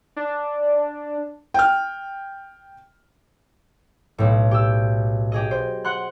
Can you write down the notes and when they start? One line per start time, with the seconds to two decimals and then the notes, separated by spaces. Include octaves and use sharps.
0.16 D4
1.54 G5 F6
4.18 B1 A2
4.51 G4 E6
5.32 G4 G#4 D#5
5.51 C5
5.85 F#5 C6 F#6